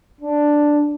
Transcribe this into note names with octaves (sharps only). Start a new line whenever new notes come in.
D4